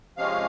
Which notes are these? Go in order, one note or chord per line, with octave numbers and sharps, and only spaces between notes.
C3 F3 G#3 C#4 F5